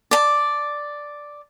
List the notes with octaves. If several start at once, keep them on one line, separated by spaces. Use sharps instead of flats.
D5 A5